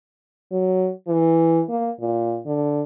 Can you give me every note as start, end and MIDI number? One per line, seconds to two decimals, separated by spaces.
0.52 0.90 54
1.07 1.62 52
1.69 1.90 58
2.00 2.39 46
2.45 2.83 50